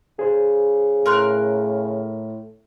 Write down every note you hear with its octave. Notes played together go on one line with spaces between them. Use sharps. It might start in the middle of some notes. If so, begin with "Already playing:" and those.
C#3 G#4 C5
A2 A#4 C6 F#6